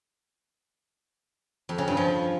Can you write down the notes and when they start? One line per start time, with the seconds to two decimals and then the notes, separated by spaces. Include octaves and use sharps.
1.69 F2
1.78 C#3
1.88 G2
1.97 F3